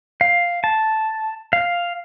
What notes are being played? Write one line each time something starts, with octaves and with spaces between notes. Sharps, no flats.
F5
A5
F5